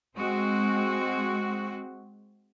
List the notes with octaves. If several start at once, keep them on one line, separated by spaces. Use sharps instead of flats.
G#3 C4 F#4